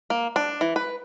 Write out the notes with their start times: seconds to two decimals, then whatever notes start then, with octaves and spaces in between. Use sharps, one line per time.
0.10 A#3
0.36 D4
0.61 E3
0.76 B4